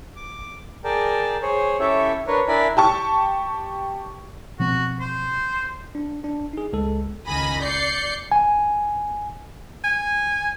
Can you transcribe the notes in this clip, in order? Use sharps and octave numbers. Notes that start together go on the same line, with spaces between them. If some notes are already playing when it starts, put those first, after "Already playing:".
D6
G#4 A#4 D5 G5 A5
G#4 C5 C#5
C#4 E4 G4 A4 C#5 E5
D4 A#4 B4 C#5
D4 E4 A#4 D5 G#5 B5
G4 A5 C#6
B2 F3 C4 F#4
C5
D4
D4
D#4 G#4
C#2 G#3 A4
C#2 D#3 G#5 B5 A#6
D5 G6 C7 C#7
G#5
G#5